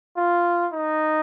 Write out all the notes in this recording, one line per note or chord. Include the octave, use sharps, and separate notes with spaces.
F4
D#4